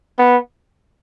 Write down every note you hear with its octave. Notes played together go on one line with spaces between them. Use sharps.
B3